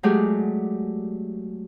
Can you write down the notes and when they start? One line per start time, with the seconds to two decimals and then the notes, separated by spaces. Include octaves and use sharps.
0.03 F#3 G#3 A3 G4 G#4 D5